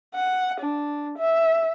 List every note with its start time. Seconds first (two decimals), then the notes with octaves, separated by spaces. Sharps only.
0.15 F#5
0.61 D4
1.18 E5